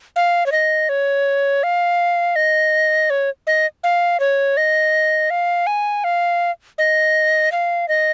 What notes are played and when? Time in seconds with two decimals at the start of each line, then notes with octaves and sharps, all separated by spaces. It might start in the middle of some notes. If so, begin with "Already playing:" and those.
0.16 F5
0.46 C#5
0.52 D#5
0.89 C#5
1.63 F5
2.36 D#5
3.10 C#5
3.47 D#5
3.84 F5
4.20 C#5
4.57 D#5
5.30 F5
5.67 G#5
6.04 F5
6.78 D#5
7.52 F5
7.88 D#5